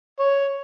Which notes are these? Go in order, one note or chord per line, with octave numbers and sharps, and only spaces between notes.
C#5